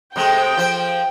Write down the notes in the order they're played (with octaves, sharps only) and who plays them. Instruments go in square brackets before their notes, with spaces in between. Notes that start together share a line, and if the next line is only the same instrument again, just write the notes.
[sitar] C3 G#3 A3 [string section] G5
[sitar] F3 C5